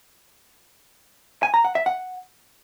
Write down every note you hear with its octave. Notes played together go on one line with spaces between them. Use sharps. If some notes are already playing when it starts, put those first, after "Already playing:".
G#5
A#5
F#5
E5
F#5